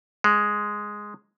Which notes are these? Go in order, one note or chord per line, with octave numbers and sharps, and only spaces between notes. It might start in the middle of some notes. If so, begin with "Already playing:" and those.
G#3